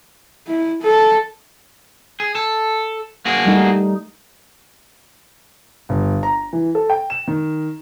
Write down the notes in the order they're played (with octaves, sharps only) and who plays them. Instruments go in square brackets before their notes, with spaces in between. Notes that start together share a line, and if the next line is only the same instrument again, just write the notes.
[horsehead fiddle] E4
A4
[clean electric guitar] G#4
A4
A#3 F#4 G#4
[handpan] G3 A3 D#4
[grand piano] G1
A#5
E3
A4
G5
E7
D#3